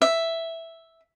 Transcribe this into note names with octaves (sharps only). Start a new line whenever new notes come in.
E5